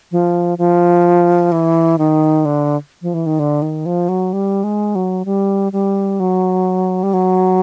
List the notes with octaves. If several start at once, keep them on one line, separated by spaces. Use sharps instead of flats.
F3
F3
E3
D#3
D3
F3
E3
D#3
D3
D#3
F3
F#3
G3
G#3
F#3
G3
G3
F#3
G3
F#3